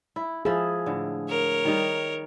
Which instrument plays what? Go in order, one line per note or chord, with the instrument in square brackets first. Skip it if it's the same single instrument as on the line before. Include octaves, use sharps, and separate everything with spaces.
[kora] E4
[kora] F3 E4 E5 [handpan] G#4
[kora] A2 D3
[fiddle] A#4 C#5
[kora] D#3 G3 D#4